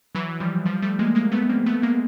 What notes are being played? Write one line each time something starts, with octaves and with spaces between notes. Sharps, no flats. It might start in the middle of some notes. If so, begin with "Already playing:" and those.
E3 F#3
F3 G3
F3 G3
G3 A3
G#3 A#3
G#3 A#3
A3 B3
A#3 C4
A3 B3
G#3 A#3